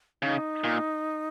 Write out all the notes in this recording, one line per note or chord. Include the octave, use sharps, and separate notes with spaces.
C#3 D#4
A#2